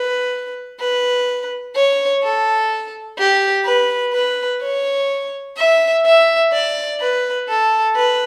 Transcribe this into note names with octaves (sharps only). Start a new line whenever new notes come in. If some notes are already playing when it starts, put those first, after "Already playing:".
Already playing: B4
B4
C#5
A4
G4
B4
B4
C#5
E5
E5
D5
B4
A4
B4